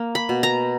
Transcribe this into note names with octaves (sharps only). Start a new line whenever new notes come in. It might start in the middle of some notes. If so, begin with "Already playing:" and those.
Already playing: A#3
B5
B2
A#5